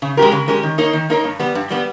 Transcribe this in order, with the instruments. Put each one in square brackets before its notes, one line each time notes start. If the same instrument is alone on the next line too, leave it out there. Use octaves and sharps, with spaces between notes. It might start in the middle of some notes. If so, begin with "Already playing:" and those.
[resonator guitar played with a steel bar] C#3
G#3 C#4 G4 A#4
C#3
G#3 C#4 G4 A#4
D#3
A#3 D#4 A#4 C#5
D#3
A#3 D#4 A#4 C#5
G2
G3 B3
G2
G3 B3